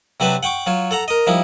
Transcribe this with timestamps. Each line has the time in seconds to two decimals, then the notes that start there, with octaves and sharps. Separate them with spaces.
0.20 C3 F#3 C4 D4 B4 A5
0.43 F#5 G5 C#6 D6
0.66 F#3 F4 C#5
0.91 A4 F#5 A#5
1.08 A#4 D#5
1.27 F3 G3 D#4 E4